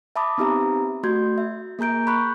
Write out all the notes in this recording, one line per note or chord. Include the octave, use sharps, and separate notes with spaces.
E5 A5 B5 D6 D#6
B3 C4 D#4 G4 E5 A#5
A3 F#4 C6 G6 G#6
E5
A#3 G#4 A#5 G6 D7
B5 C#6 F#6 G6